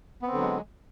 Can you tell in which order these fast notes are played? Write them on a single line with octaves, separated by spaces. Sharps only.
B3 C4 D3 F#3 G#3